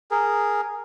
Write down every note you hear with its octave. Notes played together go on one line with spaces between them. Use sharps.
G#4 A#4